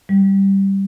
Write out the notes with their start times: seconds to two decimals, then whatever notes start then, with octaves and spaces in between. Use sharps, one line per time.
0.09 G3